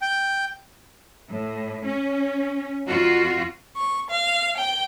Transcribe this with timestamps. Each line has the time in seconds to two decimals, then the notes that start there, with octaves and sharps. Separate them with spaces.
0.02 G5
1.30 A2
1.85 C#4
2.85 F2 F4 F#4
3.76 C#6
4.09 F5
4.56 G5